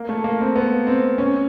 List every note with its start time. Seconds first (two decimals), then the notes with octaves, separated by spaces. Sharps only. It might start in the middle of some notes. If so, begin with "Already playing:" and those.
Already playing: A#3
0.09 A3
0.24 A#3
0.41 C4
0.56 B3
0.87 C4
1.18 C#4